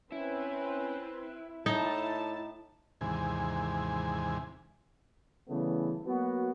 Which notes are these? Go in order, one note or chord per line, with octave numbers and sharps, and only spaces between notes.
C4 C#4 E4 B4
A2 D#4 A5
D#2 G#2 C3 E3 G#5
C#3 E3 G3 A3 B3
F#3 A#3 B3 F#4